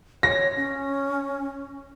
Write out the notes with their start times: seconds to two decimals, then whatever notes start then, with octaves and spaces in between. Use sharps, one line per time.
0.23 C#5 A#6
0.56 C#4